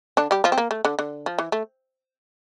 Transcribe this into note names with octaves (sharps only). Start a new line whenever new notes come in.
D3 D4
G3 G4
F3 F4
C4
A#3
A3
D3
D3
F3
E3
A3